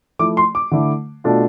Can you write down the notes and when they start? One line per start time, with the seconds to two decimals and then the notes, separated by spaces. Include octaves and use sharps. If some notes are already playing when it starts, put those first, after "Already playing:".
0.19 F3 A3 E4 D6
0.37 C6
0.55 D6
0.71 D3 A3 E4
1.24 B2 A3 D4 F4